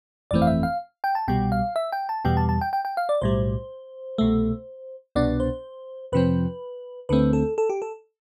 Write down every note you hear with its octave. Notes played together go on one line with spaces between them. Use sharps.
G1 F2 E3 A3 C4 D5
F5
E5
F5
G5
A5
C2 B2 G3 G5
F5
E5
G5
A5
E2 B2 G3 G5
A5
A5
G5
G5
G5
F5
D5
B1 A2 G3 C5
C2 B2 A3
C2 B2 B3 D4 D5
C5
F2 C3 F3 C4 B4
D2 D3 A3 C4 B4
A4
A4
G4
A4